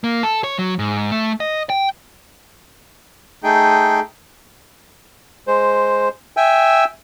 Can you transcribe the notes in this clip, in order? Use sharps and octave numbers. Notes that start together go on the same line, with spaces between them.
A#3
A4
C#5
F#3
G#2
A3
D#5
G5
A3 D#4 G#4 G5
G#3 C5
E5 G5 G#5 E6